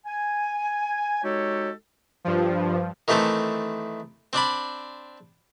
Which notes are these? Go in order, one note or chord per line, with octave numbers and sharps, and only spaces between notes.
G#5
G#3 D#4 F#4 G4 A4 C#5
G2 F3
D#3 E3 A3 C4 A4
C4 D4 D5 B5